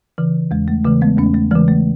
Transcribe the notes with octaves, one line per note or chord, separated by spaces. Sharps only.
C#3 E3
E2 G#3
A3
C#3 E3 A3
G#3 B3
E2 A3 C#4
A3
C#3 E3 G#3
A3